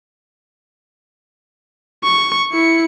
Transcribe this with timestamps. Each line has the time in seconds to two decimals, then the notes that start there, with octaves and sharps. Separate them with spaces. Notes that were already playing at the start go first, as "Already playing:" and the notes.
2.04 C#6
2.53 E4 C#7